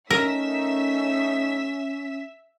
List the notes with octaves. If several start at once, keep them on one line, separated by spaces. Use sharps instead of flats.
A3 C#4 D#4 A#4 E5 E6 B6